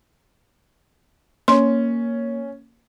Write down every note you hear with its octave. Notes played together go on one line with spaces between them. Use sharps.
A#3 C#4 C6